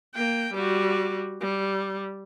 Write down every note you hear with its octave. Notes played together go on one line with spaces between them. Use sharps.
A#3 G5
G3 F#4
G3